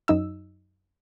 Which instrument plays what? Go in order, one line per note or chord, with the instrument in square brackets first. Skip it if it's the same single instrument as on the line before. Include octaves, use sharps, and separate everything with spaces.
[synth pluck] F#2 D#4 E6